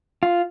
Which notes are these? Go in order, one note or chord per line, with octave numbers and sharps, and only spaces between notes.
F4